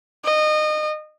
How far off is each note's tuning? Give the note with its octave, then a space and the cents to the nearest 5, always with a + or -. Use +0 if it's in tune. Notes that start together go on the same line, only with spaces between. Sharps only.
D#5 -25